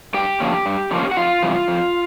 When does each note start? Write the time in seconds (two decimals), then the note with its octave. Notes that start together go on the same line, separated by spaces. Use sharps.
0.14 G2 G4 G5
0.40 D3 F3 A#3 C#4
0.66 G2
0.91 D3 F3 A#3 C#4
1.11 F#5
1.17 F2 F4 F5
1.42 C3 E3 G3
1.68 F2